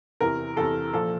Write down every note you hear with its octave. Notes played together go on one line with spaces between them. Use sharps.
E2 C3 E3 A#4
E2 C3 E3 A4
A#2 F3 A4